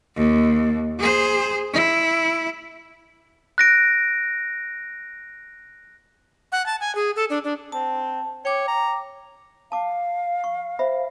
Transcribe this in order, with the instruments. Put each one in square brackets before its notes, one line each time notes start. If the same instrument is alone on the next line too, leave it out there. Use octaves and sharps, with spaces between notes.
[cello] D#2
G#4 C5
E4
[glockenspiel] F#6 A#6 D7
[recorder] F#5
A5
G#5
G#4
A4
D4
D4
[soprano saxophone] C4 [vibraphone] A5
[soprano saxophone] C#5 [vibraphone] G5 D6
[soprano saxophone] A#5
[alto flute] F5 [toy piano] A5 D6
[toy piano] C#6
C5 E5 B5